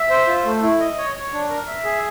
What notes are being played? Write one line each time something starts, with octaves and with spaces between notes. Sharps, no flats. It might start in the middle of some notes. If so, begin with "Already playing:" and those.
Already playing: E5
C5
F4
A3
E4
D#5
C#5
C#5
D4
A#4
E5
G#4